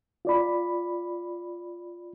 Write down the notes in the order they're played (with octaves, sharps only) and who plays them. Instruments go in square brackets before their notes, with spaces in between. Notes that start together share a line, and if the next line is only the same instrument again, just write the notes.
[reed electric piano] F4 D5 B5